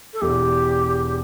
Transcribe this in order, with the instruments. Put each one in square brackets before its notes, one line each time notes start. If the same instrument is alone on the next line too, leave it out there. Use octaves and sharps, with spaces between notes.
[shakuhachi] A4
[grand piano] E1 E2 E3 [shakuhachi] G4